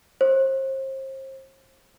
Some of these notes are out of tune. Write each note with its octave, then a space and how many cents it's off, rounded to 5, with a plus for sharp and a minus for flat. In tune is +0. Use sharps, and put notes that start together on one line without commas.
C5 +35